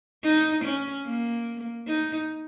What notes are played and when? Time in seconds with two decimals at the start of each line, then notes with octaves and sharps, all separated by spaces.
0.24 D#4
0.65 C#4
1.06 A#3
1.87 D#4